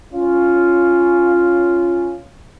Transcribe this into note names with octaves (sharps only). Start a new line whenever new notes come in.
C#4 F4